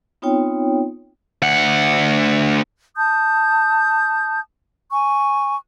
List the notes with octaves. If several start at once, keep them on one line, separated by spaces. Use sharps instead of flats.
B3 C4 D#4 F4 C#5 G5
D2 F#5
A5 D#6 G6
G#5 C#6